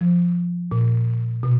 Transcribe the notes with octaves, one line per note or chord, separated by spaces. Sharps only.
F3
A#2
B2